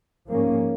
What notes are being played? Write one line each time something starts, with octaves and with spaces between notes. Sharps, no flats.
G#2 F3 A#3 C#4